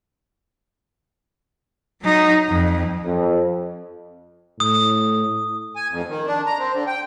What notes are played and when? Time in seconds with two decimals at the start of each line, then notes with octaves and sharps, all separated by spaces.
2.02 F#3 D#4
2.48 F2
3.04 F2
4.60 A2 D#6
5.76 G#5
5.90 F2
6.09 D#3
6.27 D4
6.46 A#5
6.59 C4
6.73 D3
6.87 G5